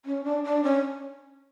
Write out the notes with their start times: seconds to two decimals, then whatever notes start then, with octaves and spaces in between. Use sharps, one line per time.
0.05 C#4
0.24 D4
0.44 D4
0.64 C#4